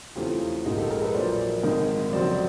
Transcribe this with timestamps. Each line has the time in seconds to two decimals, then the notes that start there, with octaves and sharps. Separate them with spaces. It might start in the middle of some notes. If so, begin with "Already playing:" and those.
0.16 E2 C#3 E3 A3 C4 F4 G4
0.65 A#1 G#2 F3 A#3 D#4 F#4 G#4
0.78 G4 A4
0.90 G#4 A#4
1.02 A4 B4
1.14 A#1 A#2 F#3 C5 D5
1.63 G#1 G#2 D#3
2.12 F1 F2 C#3 F#3 C5 D5